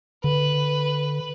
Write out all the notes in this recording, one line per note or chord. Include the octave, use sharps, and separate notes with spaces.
D3 B4